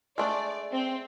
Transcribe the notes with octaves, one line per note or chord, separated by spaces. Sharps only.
G#3 A3 D4 D5
C4